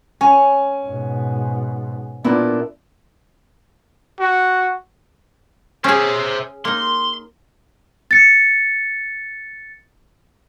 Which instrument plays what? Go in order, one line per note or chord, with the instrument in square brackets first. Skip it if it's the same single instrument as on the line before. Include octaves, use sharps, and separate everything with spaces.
[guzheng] C#4 [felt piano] G#5
[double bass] G#2 B2
[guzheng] A#2 E4 [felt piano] B3 F4 [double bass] D4
[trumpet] F#4
[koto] C#4 G#4 [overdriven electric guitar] C5 E5
[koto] A#3 D#4 [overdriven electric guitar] C6
[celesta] A6 C#7